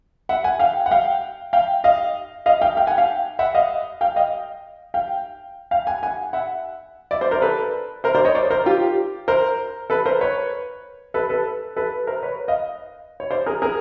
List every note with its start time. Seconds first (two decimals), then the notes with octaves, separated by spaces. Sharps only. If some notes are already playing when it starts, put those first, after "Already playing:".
0.29 E5 F#5
0.44 F#5 G#5
0.60 F5 G5
0.86 F#5
0.91 F5 G5
1.53 F5 G5
1.84 D#5 F5
2.46 D#5 F5
2.61 F5 G5
2.77 F5 G5
2.87 F#5 G#5
2.98 F5 G5
3.39 E5 F#5
3.54 D#5 F5
4.01 F5 G5
4.16 D#5 F5
4.94 F5 G5
5.71 F5 G5
5.87 F#5 G#5
6.03 F#5 G#5
6.33 E5 F#5
7.11 D5 E5
7.21 C5 D5
7.31 A#4 C5
7.42 A4 B4
8.04 A#4 C5
8.15 C5 D5
8.25 C#5 D#5
8.35 C5 D5
8.51 A#4 C5
8.66 F4 G4
9.28 A#4 C5
9.90 A4 B4
10.06 A#4 C5
10.21 B4 C#5
11.14 A4 B4
11.29 A4 B4
11.77 A4 B4
12.07 A#4 C5
12.23 B4 C#5
12.48 D#5 F5
13.20 C#5
13.31 C5 D5
13.46 G#4 A#4
13.62 G#4 A#4